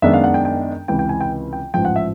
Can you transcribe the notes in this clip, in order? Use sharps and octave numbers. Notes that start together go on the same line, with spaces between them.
F#2 D#3 G#3 B3 D4 E5
F5
F#5
G5
G5
C#2 C3 E3 G5
G5
G#5
G5
G5
A1 G#2 F3 G5
F#5
E5